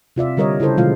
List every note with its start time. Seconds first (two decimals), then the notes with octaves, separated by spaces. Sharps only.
0.16 C3 F4 D5 E5
0.37 D3 G3 A#4 C#5 D#5
0.60 C#3 E4 G4 A4 C5
0.77 B2 D3 F3 G#3 F4 F5